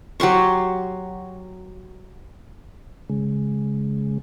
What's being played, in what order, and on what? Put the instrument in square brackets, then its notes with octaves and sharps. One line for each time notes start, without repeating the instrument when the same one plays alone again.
[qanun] F#3 G4 C6 C#6
[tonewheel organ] C#3 G#3